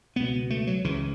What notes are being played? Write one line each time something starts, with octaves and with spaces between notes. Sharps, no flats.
C#2 B2 B3
A3
F#3
C#2 C#3 E3